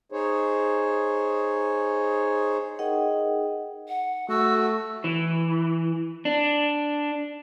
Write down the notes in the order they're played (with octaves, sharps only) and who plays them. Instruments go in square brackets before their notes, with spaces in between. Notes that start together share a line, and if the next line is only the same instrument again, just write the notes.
[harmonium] D#4 G#4 C5 C#5
[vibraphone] D#4 G#4 A#4 D#5 F#5 G5
[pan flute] F#5
[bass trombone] A3 [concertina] F#4 [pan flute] E6
[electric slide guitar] E3
D4